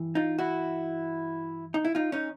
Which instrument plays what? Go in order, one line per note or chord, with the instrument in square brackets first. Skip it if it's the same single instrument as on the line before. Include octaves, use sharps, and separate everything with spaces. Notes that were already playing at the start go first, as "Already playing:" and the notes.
Already playing: [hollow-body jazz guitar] G2 E3
D#4 F4
E4 F#4
D#4
E4
D#4 F4
C#4 D#4